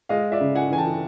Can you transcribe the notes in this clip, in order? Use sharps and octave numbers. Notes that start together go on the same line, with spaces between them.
G#3 D#5 F5
D5 E5
C#3
F#5 G#5
E3 G#5
G5 A5